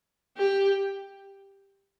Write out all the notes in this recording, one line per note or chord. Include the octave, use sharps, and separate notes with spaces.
G4